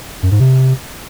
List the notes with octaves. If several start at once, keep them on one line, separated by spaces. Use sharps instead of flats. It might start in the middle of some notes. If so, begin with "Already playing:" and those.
F#2
G#2
C3